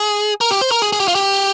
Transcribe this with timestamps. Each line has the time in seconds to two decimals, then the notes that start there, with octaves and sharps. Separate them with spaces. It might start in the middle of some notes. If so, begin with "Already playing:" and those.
Already playing: G#4
0.41 A#4
0.51 G4
0.61 C5
0.71 A#4
0.82 G#4
0.93 G#4
1.00 G4
1.08 F4
1.15 G4